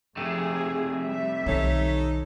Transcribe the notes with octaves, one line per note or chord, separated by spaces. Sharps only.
F2 C3 A3 G#4
G3 E5
B1 D#3 D#4 A4 C#5